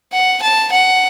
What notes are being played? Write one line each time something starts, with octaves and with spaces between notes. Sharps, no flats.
F#5
A5
F#5